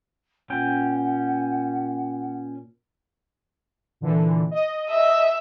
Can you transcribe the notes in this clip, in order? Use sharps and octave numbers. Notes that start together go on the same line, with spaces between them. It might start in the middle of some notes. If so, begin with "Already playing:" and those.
A#2 C#4 F#5 G5
A#2 D3 E3
D#5
E5